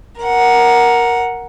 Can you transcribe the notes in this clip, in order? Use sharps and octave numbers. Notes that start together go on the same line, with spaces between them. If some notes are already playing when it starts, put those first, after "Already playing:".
A#4 F#5